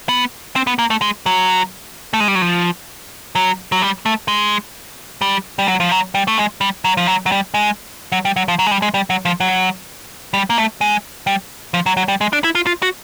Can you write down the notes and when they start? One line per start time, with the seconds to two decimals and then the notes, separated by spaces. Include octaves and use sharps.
0.09 B3
0.56 C4
0.67 B3
0.79 A#3
0.90 A3
1.02 G#3
1.26 F#3
2.13 A3
2.20 G#3
2.28 G3
2.35 F#3
2.42 F3
3.35 F#3
3.72 F#3
3.82 G3
4.06 A3
4.28 G#3
5.22 G3
5.59 G3
5.68 F#3
5.80 F3
5.92 F#3
6.15 G3
6.27 A3
6.38 G#3
6.61 G3
6.85 F#3
6.97 F3
7.07 F#3
7.26 F#3
7.32 G3
7.54 G#3
8.12 F#3
8.25 G3
8.36 F#3
8.48 F3
8.59 F#3
8.67 G#3
8.71 G3
8.82 G#3
8.94 G3
9.10 F#3
9.25 F3
9.40 F#3
10.34 G3
10.50 A#3
10.58 A3
10.81 G#3
11.27 G3
11.74 F3
11.86 F#3
11.97 F#3
12.08 G3
12.21 G#3
12.33 D4
12.44 E4
12.55 F4
12.67 F4
12.83 F#4